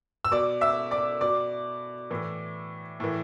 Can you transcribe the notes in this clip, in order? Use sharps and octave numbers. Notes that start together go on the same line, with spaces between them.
E6
B2 D5 D6
E5 E6
D5 D6
B2 D5 D6
A2 E3
A2 E3